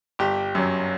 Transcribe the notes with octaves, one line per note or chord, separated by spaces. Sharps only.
G1 G4
F#2 F#3